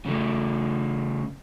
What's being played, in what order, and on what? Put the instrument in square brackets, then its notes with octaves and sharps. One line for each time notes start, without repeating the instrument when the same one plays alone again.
[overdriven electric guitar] C#3 A3